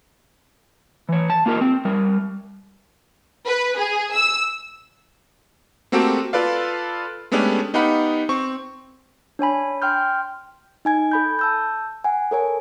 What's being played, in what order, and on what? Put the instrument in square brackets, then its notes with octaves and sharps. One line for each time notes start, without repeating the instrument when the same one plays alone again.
[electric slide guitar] E3 C#5
A5
A#3 F4 G4 A#4
C4
G3 A#4
[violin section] B4
G#4
E6
[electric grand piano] A3 A#3 C4 F#4 G4 A4
F4 A4 B4 D5 F5
G#3 A3 B3 C#4 D4 G4
B3 D#4 G4 F5 F#5 B5
C4 C#6
[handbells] D4 C#5 G#5 B5
G5 C6 F6 G6
[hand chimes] D#4 G#5 G#6
A4 B5 G6
A5 E6 G6
F#5 G#5
A4 A#4 C#5 G#5